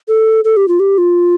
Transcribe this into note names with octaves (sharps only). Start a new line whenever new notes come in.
A4
A4
G4
F4
G4
F4